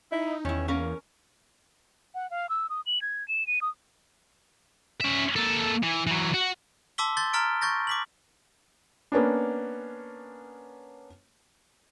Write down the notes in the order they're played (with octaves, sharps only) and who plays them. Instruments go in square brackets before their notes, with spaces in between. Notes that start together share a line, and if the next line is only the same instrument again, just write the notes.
[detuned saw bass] D#4 [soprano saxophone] E4
[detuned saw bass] E2 [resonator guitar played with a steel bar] D#3 E4 [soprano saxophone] C#4
[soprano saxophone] A#3 [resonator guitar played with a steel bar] C#4 A#4
[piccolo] F#5
F5
E6
D#6
F#7
G#6
E7
D#7
D#6
[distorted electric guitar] C#4 E5
A#3 A4
E3
E3 F#3
F#4
[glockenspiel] A5 C6 D6 E6 B6 G7
C6 G6 A6 G7
A#5 C6 F6 A6 B6 D7
C#6 G6 A6 A#6
D6 B6 F#7
[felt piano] A#3 B3 C#4 D4